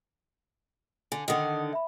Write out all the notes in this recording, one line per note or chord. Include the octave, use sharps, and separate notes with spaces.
D3 G#5
D3 D#3 D#5 F#5 D#6
E5 B5